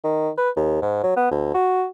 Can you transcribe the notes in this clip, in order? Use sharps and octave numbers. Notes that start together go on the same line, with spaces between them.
D#3
B4
D#2
G#2
F#3
B3
D2
F#4